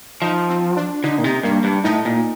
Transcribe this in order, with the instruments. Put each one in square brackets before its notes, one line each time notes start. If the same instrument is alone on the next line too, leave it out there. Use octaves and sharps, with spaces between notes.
[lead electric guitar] F3 [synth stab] D#4
[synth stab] C4
D4
[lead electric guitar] D3 [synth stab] D#4
[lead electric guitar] A#2
[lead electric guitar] C3 [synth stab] D#4
[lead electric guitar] G2 [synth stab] A#3
[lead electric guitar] G2 [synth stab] D4
[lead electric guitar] A2 [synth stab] D#4
[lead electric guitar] A#2